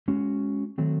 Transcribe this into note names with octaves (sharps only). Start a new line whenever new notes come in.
G#3 C#4 F#4
D#3 F#3 A3 C4